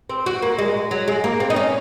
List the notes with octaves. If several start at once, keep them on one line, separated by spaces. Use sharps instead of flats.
C4
F#4
A#3
G#3
F#3
G#3
A#3
C4
D#4
C#4